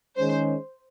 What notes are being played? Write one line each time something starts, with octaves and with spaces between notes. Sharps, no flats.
D#3 G#3 C#4 C5